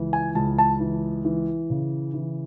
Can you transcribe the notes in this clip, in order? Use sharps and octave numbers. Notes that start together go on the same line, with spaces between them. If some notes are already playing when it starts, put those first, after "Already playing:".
Already playing: C#2 E3
G#5
C#2 A5
A5
E3
E3
C#3
E3